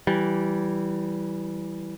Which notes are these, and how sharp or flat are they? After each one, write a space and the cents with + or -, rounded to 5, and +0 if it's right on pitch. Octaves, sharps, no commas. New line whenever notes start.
E3 +0 G3 -20